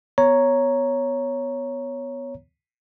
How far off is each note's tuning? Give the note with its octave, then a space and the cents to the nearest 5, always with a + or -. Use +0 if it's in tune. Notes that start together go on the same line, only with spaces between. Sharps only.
B3 +5 C#5 +0 A#5 +0